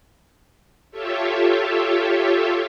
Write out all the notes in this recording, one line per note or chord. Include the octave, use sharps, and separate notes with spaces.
F4 G4 A4 C#5 E5